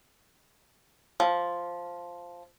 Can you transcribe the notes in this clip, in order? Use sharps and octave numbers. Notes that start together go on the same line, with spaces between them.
F3